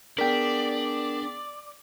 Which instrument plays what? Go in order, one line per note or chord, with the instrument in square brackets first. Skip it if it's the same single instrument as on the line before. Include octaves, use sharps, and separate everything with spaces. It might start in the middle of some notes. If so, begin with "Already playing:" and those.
[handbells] B3 G#4 B6 [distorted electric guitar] D4 [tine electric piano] A#4 G5 [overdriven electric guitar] D5